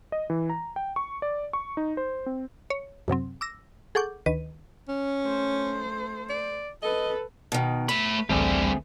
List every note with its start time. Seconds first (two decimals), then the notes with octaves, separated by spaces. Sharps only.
0.12 D#5
0.30 E3
0.50 A#5
0.76 G5
0.96 C#6
1.22 D5
1.53 C#6
1.77 D#4
1.97 C5
2.26 C4
2.70 C#5
3.08 F#2 C3 F#3 C4
3.41 D6 E6 A#6
3.95 G#4 A4 F#5 C#6 D6 G6
4.26 D2 D#3 B4 D#7
4.89 C#4
5.22 A3 C5
6.30 D5
6.83 A4 B4 D#5
7.52 B2 D#3
7.89 A3 B4 B5
8.29 A1 D2 D3 G3 A3 C4 G#4